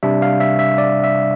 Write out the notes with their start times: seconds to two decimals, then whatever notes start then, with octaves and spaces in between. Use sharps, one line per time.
0.03 C3 G3 D4 E5
0.22 F5
0.40 E5
0.59 E5
0.78 D5
1.04 E5